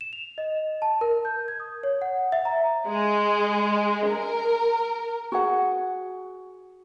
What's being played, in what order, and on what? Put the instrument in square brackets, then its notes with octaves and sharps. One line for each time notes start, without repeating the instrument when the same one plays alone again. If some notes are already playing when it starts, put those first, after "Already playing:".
[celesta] E7
F7
D#5
A5
A#4
G6
G#6
D#6
C#5
F#5
E5
A#5
[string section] G#3
A#4
[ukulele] F#4 G#4 F#5